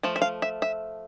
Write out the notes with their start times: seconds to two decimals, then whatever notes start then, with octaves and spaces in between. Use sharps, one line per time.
0.03 F3 A3
0.16 E5
0.22 F5
0.42 E5
0.62 E5